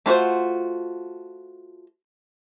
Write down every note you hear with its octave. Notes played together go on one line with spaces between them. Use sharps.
A3 F4 F#4 C5